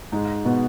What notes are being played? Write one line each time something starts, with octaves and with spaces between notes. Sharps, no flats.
G#2 G#3
B2 B3